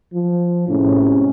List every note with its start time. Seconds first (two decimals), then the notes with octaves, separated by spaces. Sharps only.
0.14 F3
0.68 A2 C3 G#3 C#4